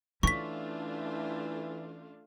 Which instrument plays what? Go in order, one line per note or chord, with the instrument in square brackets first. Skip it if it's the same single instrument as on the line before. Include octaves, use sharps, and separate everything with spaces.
[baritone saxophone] E3 [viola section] A3 D4 F4 [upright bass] C#4 [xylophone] C#6 B6